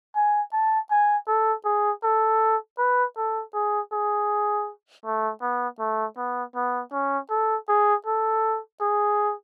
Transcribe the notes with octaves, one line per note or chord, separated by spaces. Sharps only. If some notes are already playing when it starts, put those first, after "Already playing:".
G#5
A5
G#5
A4
G#4
A4
B4
A4
G#4
G#4
A3
B3
A3
B3
B3
C#4
A4
G#4
A4
G#4